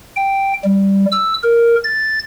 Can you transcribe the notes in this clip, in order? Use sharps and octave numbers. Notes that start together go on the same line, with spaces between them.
G5
G3
E6
A#4
A6